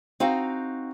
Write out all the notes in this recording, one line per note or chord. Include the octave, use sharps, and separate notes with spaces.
C4 D#4 F#4 F5